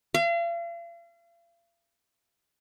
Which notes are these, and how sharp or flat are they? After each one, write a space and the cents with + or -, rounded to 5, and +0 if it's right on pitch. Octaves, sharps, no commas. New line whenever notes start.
F5 -40